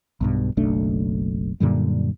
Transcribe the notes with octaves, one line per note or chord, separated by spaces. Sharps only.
B1 G2 B2
F#1 B1 A3 D4
F#2 A#2 D3 G3